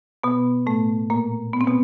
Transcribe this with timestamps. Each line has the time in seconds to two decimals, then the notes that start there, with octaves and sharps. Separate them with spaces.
0.23 B2 B3
0.66 A2 A3
1.10 A#2 A#3
1.53 B3
1.61 C4
1.67 B2 B3